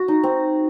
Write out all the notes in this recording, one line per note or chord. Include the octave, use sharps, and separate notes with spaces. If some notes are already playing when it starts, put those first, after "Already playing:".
Already playing: F#4
D#4
C4